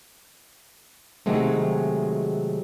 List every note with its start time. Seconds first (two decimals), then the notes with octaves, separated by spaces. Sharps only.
1.26 C3 D#3 F#3 G#3 A3